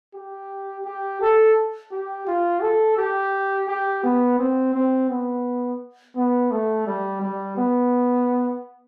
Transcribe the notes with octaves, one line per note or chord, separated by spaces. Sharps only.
G4
G4
A4
G4
F4
A4
G4
G4
B3
C4
C4
B3
B3
A3
G3
G3
B3